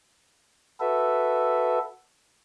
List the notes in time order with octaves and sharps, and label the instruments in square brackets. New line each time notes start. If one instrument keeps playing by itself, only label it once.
[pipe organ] F#4 A4 B4 E5